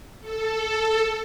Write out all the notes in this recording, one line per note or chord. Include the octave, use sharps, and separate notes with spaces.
A4